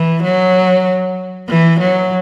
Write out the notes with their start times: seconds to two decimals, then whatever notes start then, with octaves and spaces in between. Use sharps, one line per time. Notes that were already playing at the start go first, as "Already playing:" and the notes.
Already playing: E3
0.24 F#3
1.49 E3
1.81 F#3